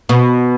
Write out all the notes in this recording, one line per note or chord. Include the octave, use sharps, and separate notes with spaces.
B2